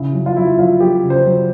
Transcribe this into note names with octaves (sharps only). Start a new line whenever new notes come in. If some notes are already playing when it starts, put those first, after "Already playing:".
Already playing: C#3 E4
F#3
F4
F#3 E4
F#3 F4
F#3 G4
C#3
C5
F#3